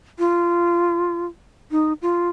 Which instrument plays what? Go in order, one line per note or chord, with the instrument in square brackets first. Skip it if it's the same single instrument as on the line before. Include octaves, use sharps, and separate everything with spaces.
[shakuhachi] F4
D#4
F4